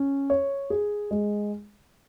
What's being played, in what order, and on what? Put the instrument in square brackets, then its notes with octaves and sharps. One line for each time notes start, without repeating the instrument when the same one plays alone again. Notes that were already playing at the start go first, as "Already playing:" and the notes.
Already playing: [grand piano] C#4
C#5
G#4
G#3